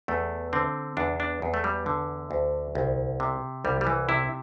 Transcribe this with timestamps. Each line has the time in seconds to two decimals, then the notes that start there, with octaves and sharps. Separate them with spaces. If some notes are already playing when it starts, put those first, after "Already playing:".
0.08 E2 A3
0.53 D3 C4
0.97 E2 D4
1.20 D4
1.42 E2
1.54 A3
1.64 G3
1.86 D3
2.31 D2
2.75 C2
3.20 C3
3.65 C2 G3
3.81 G3
3.87 E3
4.09 C3 E4